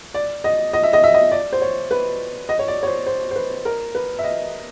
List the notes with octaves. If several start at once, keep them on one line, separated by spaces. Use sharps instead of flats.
D5
D#5
D#5
E5
D#5
E5
D#5
D5
C5
C#5
B4
D#5
C#5
D5
C#5
C5
C5
C5
B4
A#4
B4
E5
D#5